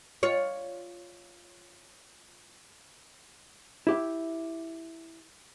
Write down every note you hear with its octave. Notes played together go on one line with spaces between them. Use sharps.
F4 C#5
E4 G4 E5